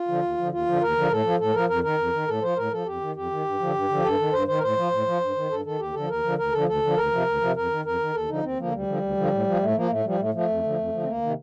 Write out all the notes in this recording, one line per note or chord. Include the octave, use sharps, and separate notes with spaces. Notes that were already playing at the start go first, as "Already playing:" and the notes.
Already playing: F4
D3 F3
D#2
D3 F3
D#2 F4
D3 F3
D#2 A#4
D3 F3
A2 A4
F3
A2 A4
F3 A#4
F2 A#4
D#3 A#4
F2
D#3
A2 A4
F3 C5
A2 A#4
F3 A4
F2 G4
D#3
F2 G4
D#3
G2
D3 F3
G2
D3 F3
G2 A4
D#3
G2 C5
D#3 C5
A#4
A2 C5
F3
A2
F3
G2
D#3
G2 A4
D#3 A4
D#2 G4
D3 F3 A4
D#2 A#4
D3 F3
D2 A#4
D3 F3 A4
D2 A4
D3 F3
D2 A#4
C3 F3
D2
C3 F3
F2 A#4
D#3
F2 A#4
D#3
D#2 A4
D3 F3 D#4
D#2 C4
D3 F3 A#3
D2 G3
D3 F3
D2
D3 F3
A2
F3
A2 A3
F3 A#3
A2 A3
F3 G3
A2 A3
F3 A3
F2
D3 F3
F2
D3 F3
C4
D2 A#3
C3 D#3